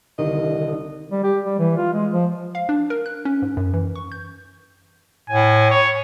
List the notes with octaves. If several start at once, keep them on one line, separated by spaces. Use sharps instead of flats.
C2 D3 D#3 D#5
G3
G4
G3
E3
F4
G#3
F3
F5
D4
A#4
F#6
C#4
G#2
F#2
E3
C#6
G6
A2 G#5
C#5